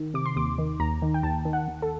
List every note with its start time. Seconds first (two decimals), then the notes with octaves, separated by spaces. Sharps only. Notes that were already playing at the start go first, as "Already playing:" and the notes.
Already playing: D#3
0.14 C3 D6
0.26 C6
0.36 D#2 D6
0.58 D#3
0.80 D#2 A#5
1.02 D#3
1.14 G5
1.23 D#2 A5
1.45 D#3
1.53 F#5
1.68 D#2
1.82 A4